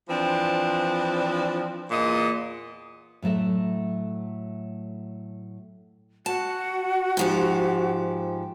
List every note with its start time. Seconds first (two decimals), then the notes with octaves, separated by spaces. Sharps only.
0.09 E3 F3 C4 D4
1.91 E2 A#2 D#5
3.22 A2 F#3 A3 E5
6.26 F#4 A5
7.17 G#2 F3 G4